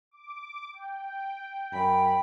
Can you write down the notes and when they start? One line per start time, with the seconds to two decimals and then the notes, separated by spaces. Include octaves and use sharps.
0.11 D6
0.73 G5
1.73 F#2 G5 B5